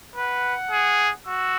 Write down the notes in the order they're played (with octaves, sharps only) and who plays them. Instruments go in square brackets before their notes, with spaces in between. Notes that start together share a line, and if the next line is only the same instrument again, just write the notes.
[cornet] B4 [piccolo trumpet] F#5
[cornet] G#4
[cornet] F#4 [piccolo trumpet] E6